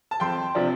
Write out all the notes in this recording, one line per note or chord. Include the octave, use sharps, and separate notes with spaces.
A5
F2 G5 C6
C3 F3 D4